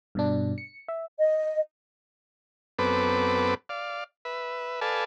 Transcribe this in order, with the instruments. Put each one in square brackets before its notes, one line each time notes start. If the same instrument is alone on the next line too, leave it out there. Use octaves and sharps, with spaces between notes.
[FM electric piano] G2 B2 D4
C#7
E5
[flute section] D#5
[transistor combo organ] F#2 B3 C4 A4 B4 D6
D5 F5
B4 E5
A4 B4 D5 F5 G#5 A5